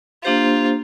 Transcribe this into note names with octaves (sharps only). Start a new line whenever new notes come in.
A#3 D4 F4 G4 C5